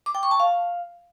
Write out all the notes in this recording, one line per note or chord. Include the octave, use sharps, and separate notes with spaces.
D6
G5
C#6
A5
F5